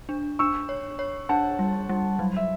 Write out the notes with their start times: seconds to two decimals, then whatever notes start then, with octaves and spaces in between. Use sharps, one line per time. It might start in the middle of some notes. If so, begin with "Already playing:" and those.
0.09 D4
0.39 D4 C#6 E6
0.69 C#5
0.99 C#5
1.29 D4 F#5 A5
1.59 G3
1.89 G3
2.19 F#3
2.37 E5